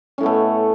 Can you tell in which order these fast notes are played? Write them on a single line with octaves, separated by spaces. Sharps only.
C#4 A2 B3 A3